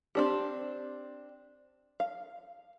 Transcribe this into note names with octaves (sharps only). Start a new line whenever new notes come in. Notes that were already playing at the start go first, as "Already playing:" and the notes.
C4 D4 G4
F5